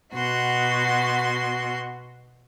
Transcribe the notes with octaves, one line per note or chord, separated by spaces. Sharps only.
B2 F#4 C6